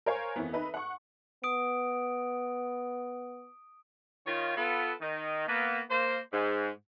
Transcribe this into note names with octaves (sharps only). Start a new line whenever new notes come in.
A#4 C5 C#5 F5 G#5
F2 E3 B3
D#4 B4 E5
F#5 C#6
B3 D#6 D7
D#3 F4 C#5
B3 F4 A4
D#3 D#4
A#3 B3
A#3 C5
G#2